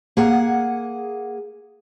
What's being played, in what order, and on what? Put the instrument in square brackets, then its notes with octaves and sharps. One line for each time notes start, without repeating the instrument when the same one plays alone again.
[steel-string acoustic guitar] A#3 G#4 F#5